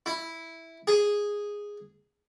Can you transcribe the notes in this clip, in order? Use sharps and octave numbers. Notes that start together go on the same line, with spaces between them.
E4
G#4